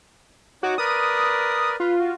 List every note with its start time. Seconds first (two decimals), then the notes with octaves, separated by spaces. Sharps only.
0.63 D#4 F#4 C#5 D6
0.78 A#4 B4 D5 D#6
1.80 F4 B4
1.99 F#4